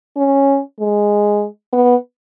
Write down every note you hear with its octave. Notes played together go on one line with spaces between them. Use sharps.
C#4
G#3
B3